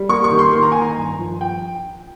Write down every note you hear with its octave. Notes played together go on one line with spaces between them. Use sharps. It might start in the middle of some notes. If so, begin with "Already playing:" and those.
Already playing: G3
A#3 C#6
C#6
D#3
C6
A#3 C6
A#5
D#3 G#5
A#5
G2
F3
G5